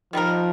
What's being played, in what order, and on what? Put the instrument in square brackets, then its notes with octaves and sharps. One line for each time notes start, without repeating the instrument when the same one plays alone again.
[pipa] D#3 G3 D#4 A#4 [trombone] F3